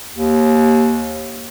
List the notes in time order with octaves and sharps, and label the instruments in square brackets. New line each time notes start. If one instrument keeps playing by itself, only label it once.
[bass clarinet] D#2